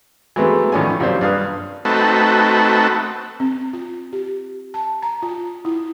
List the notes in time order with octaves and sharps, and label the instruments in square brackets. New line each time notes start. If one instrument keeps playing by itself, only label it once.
[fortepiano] E3 F#3 G#3 A3 B3 C4
A2 D#3 F3 C#4 D5 G#5
A#1 F#2 C3 G3 D4 C5
G2 B4 F5 D#6
[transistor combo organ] A3 C4 D#4 F#4 A4 B4
[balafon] C4
F4
G4
A5
A#5
F4
E4